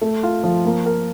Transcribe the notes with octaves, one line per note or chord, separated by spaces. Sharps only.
A3
F4
F3
A#3
A#4